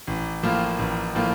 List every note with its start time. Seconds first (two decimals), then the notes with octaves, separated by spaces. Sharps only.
0.07 A1
0.43 A2 F3 A#3 F4
0.79 A1
1.15 A2 F3 A#3 F4